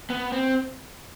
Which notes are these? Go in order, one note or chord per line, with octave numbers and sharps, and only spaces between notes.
B3
C4